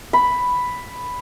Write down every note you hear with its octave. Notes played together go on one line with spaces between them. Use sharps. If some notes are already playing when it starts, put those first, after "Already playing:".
B5